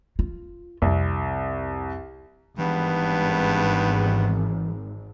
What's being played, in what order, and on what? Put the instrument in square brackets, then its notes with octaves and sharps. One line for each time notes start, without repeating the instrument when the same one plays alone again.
[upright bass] F4
[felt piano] C2 [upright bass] F2
[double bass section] G#1 [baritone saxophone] G2 [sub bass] E3 [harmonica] B3